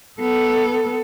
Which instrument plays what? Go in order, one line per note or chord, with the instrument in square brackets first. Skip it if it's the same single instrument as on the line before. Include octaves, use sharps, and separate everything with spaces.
[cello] B3 A4